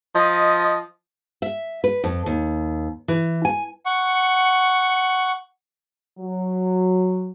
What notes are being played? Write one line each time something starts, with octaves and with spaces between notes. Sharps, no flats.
F3 D#5
E5
B4
F2
D#2
E3
G#5
F#5 C#6
F#3